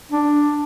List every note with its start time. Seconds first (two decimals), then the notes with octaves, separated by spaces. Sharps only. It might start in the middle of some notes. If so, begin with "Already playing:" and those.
0.12 D4